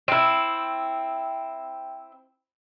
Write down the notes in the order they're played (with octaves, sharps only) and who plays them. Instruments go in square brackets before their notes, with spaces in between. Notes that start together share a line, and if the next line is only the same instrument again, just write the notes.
[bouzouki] C4 E4